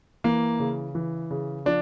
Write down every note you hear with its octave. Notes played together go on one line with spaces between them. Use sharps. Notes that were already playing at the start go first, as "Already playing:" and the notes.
E3 A#3
C#3
E3
C#3
F3 D4